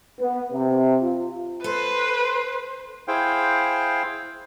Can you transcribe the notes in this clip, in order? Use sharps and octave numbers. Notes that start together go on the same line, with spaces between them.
B3
C3
F4
A4 B4 C5
E4 G#4 C5 F5 G5